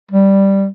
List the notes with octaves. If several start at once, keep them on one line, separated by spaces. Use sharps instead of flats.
G3